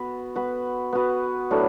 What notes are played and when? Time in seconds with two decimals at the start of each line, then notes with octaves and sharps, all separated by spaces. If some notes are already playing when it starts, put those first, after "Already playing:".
Already playing: B3 F#4 B4
0.36 B3 F#4 B4
0.93 B3 F#4 B4
1.51 A2 F#3 B3 D4